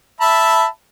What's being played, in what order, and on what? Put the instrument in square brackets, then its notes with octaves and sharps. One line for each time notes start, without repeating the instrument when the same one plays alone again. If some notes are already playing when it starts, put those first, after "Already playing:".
[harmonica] E5 A5 B5